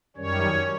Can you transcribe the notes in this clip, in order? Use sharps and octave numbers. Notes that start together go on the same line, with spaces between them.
F#2 D#3 G3 C#4 C#5